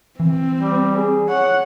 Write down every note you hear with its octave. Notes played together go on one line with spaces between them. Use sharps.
E3 C4
G3
G#4
C#5 F#5